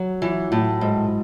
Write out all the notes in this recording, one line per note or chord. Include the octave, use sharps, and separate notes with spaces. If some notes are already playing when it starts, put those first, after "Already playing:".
Already playing: F#3
E3
A2
G#2